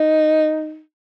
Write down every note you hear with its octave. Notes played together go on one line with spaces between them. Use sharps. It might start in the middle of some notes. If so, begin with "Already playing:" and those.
Already playing: D#4